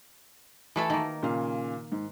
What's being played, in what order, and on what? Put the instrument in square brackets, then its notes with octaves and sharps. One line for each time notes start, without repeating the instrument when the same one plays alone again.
[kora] E3 A3 A4
D#3 A#3
[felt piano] A#2 C#3 F5
G#2